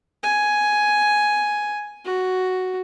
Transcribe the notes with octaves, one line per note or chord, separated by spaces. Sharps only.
G#5
F#4